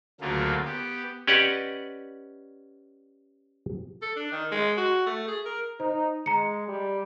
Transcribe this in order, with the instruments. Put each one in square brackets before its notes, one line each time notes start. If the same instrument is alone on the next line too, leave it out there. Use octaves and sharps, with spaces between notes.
[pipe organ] D2 C#3 F#3 A3 A#3 F4
B3 G4
[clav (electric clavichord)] C#4 G4 B4 D5 D#5 F#5
[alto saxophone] A4
D4
D#3
G#3
F#4
A3
G#4
A#4
[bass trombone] D#4 [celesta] C5
[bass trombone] G#3 [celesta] A#5 C#7
[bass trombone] G3